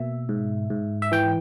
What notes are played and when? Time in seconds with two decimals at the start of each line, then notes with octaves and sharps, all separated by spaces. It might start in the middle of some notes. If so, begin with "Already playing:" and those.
Already playing: B2 A#3 E5
0.29 G#2
0.70 G#2
1.02 E5
1.12 E3 G5